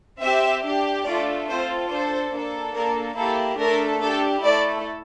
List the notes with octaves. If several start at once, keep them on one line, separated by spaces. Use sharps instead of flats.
C4 G4 E5
D4 G4
A3 D4 F4 A4 D5
C4 F4 A4 C5
D4 A4 C5
A#3 D4 A4
A#3 D4 A4 A#4
A#3 E4 G4 A4
A3 D4 A4 A#4
D4 G4 A4
A3 E4 A4 D5